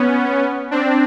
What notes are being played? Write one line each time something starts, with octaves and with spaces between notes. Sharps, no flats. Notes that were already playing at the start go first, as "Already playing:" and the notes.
Already playing: B3 C#4
C4 D4